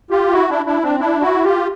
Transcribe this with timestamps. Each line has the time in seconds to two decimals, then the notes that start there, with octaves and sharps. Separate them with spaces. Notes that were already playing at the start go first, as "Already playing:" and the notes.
0.10 F4 G4
0.32 E4 F#4
0.50 D4 E4
0.66 D4 E4
0.82 C4 D4
0.99 D4 E4
1.22 E4 F#4
1.44 F4 G4